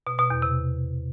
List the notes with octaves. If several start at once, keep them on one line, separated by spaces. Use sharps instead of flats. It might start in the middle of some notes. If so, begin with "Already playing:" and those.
B2
B2
E2
C3